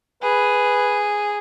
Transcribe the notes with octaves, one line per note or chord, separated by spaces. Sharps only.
G#4 B4